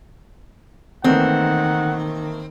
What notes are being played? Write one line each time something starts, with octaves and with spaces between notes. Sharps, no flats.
D#3 E3 A3 A#3 C4 F#5